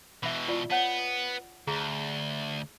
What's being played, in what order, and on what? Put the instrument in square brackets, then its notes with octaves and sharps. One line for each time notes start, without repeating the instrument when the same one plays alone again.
[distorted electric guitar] B2 E3 [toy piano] E5 B5
[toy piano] F4 D5
[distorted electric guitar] B3 [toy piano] C#5 F#5 A5
[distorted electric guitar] D2 [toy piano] G#4 A#5